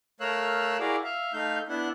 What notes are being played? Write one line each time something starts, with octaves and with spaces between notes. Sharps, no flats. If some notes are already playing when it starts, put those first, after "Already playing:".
A3 A#4 C#5 F5 E6 F#6
E4 F#4 G#4 A#4 D5 F5
E5 F5
A3 D#4 F5 G6
B3 D4 E4 F#5